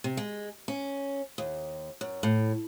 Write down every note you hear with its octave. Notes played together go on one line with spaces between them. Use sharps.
C3
G#3
C#4
D#2
F#2
A2